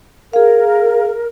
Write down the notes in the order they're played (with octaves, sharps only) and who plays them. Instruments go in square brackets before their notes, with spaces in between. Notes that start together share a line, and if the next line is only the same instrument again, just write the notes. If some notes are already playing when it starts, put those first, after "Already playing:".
[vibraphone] G#4 F5 [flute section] A#4